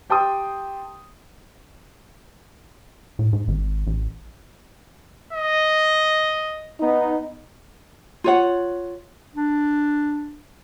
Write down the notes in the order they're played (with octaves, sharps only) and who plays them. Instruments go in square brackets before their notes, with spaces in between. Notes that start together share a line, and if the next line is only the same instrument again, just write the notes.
[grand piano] G4 G5 A5 C6 D#6
[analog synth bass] A2
G#2
G#1
A1
[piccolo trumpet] D#5
[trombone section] B3 D#4
[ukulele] F4 C#5 F#5
[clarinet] D4